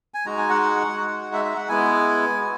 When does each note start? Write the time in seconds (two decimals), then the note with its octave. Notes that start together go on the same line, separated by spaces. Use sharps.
0.14 G#5
0.26 G#3 D#4 F#4 A#5
0.38 G#5
0.50 F#5
0.62 F#5
0.97 G#3 D#4 F#4
1.33 E5
1.45 E5
1.56 F#5
1.68 G#3 B3 E4 G#5
2.40 B3 F#4